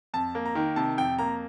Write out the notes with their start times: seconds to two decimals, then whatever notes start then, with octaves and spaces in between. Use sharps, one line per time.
0.14 F2 A5
0.35 A#3
0.46 A#5
0.55 D#3
0.76 C3 A5
0.97 F2 G5
1.19 A#3 A#5